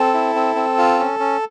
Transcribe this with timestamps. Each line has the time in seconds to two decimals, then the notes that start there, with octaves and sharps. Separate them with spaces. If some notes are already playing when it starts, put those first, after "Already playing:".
Already playing: C4 A4
0.14 E4
0.35 C4
0.56 C4
0.78 F4
0.99 C#4
1.19 C#4